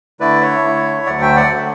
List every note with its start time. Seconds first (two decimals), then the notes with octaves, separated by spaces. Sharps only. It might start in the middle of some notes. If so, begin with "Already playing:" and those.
0.20 D3 A3 E4 B4 D5
0.41 C#5 E5
0.64 D3 A3 E4
1.06 D2 D3 F#3 A3 D5 F#5
1.21 E5 G5
1.36 D5 F#5
1.50 D3 F#3 A3